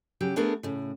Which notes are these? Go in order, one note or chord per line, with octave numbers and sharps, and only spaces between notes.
C#3 F#3 G4
A3 B3 D4 G#4 A#4
A2 C#3